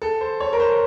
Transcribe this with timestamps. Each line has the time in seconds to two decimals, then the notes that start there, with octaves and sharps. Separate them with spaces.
0.02 A4
0.21 C5
0.40 C#5
0.53 A#4
0.60 C5